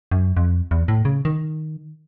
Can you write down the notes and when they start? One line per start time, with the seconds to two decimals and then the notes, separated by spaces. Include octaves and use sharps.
0.11 F#2
0.37 F2
0.71 E2
0.88 A2
1.05 C#3
1.25 D#3